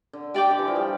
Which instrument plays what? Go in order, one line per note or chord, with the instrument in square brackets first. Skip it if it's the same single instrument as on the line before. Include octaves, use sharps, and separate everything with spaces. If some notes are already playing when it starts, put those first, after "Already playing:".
[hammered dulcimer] D3
[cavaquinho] G4 D5 G5 D6
[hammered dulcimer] D3
E3
F3
G3